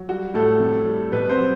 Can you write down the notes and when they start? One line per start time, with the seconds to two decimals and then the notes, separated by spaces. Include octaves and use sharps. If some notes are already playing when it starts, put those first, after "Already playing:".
Already playing: F#3
0.09 G3 F#4
0.34 A2 A3 A4
0.60 C3
0.86 G3
1.12 B2 B3 B4
1.29 C4 C5
1.38 F#3